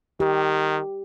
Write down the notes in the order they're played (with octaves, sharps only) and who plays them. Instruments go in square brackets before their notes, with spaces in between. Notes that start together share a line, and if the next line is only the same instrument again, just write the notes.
[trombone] D#3 [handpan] G4